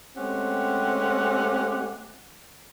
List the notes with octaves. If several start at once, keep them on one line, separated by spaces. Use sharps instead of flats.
G#3 A3 C4 C#4 G4 F#5